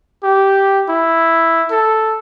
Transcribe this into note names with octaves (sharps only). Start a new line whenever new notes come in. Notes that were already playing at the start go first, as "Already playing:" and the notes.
G4
E4
A4